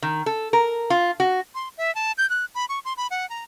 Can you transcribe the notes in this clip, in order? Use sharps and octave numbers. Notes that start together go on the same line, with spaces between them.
D#3
A4
A#4
F4
F#4
C6
E5
A5
G6
F#6
B5
C#6
C6
B5
F#5
A#5